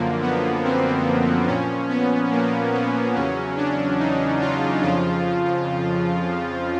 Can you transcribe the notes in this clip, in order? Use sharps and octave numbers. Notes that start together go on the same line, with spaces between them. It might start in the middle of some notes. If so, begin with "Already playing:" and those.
Already playing: F#2 D3 F3 A#3
B3
C4
A#2 F3 C#4
B3
A#3
B3
E2 C#3 F#3 C#4
D4
D#4
F4
F2 C#3 F3 F4